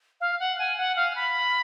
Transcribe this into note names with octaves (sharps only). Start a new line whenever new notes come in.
F5
F#5
G#5
F#5
F5
B5